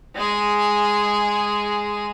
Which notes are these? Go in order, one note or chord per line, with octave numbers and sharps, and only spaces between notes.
G#3 G#4